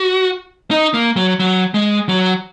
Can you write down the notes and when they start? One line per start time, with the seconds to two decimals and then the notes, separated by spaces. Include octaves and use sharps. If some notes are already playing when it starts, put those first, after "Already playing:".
Already playing: F#4
0.71 D#4
0.94 A#3
1.16 F#3
1.40 F#3
1.74 G#3
2.09 F#3